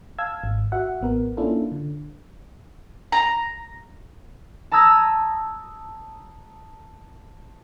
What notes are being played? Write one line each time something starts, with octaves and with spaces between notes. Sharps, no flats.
F5 A5 E6 G#6
G#1
F#4 E5 F#5
A1 B3 A#4
A#3 C#4 D4 E4 F4 A4
D3
A#5
A5 A#5 D#6 E6 G#6 A#6